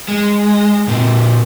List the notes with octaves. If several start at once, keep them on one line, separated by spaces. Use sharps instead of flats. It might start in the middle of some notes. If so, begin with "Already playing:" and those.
G#3
A#2 C4